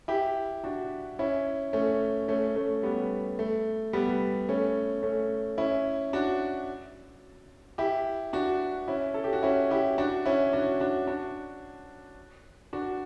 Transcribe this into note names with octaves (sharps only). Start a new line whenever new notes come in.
E4 G4
D4 F#4
C#4 E4
A3 C#4
A3 C#4
A3 C#4
G3 B3
A3
G3 B3
A3 C#4
A3 C#4
C#4 E4
D4 F#4
E4 G4
D4 F#4
C#4 E4
A4
G4
F#4
C#4 E4
E4 G4
D4 F#4
C#4 E4
D4 F#4
D4 F#4
D4 F#4
D4 F#4